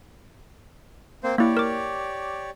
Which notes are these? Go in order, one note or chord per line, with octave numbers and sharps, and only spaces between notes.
A#3 C4 C5
A#3 E4 G4 C#5 D5
A#4 D6